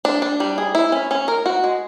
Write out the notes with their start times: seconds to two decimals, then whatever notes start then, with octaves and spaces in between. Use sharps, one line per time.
0.05 D4
0.22 D4
0.40 G3
0.58 G#4
0.75 E4
0.92 C#4
1.11 C#4
1.28 A#4
1.46 F#4
1.64 G#3